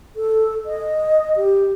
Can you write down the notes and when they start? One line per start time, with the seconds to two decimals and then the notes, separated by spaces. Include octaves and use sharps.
0.16 A4
0.66 D#5
1.37 G4